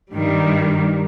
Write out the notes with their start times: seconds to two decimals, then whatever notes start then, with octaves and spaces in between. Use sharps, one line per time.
0.13 G2 D#3 G3